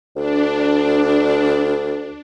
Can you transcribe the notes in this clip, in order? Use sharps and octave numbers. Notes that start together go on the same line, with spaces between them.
D2 D4